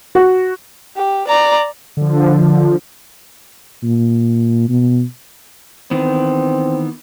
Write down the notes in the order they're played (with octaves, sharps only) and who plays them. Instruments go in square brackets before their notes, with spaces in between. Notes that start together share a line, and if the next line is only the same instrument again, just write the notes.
[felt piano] F#4
[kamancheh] G4
D5 A#5
[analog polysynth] D3 F3
[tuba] A#2
B2
[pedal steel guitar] D#3 E3 B3 [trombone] C4